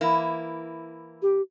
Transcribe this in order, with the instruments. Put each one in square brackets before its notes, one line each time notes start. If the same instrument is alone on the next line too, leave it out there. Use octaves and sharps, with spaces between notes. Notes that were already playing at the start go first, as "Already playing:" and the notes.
[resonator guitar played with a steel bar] E3 A#3 E4
[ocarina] G4